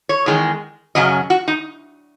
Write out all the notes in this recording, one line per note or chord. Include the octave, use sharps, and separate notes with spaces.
C#5
E2 D#3 G#3
F#2 C#3 F#3 C#4 D#5
F#4
D#4